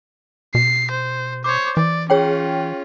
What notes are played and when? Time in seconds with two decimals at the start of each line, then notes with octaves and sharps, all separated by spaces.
0.55 B2 C7
0.91 C5
1.44 C5 C#5 D6
1.77 E3 D5
2.10 C#4 F4 G#4 C#5 G5